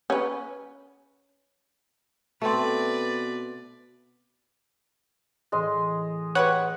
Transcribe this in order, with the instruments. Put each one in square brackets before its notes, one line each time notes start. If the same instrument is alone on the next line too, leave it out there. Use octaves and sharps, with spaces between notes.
[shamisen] C#4 B4
[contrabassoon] B2 [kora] A3 C4 [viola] B4 D5
[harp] A2 E3 [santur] G#3 D#5 C6
[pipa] G4 B4 C#5 [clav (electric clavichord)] F#5